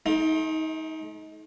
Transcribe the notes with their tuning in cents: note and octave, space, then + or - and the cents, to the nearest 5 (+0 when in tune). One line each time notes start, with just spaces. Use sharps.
A3 -40 D#4 +25